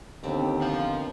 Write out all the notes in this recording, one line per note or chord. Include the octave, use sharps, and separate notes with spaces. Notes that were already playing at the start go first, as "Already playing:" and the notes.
D#2 D3 B3 C4
F3 F5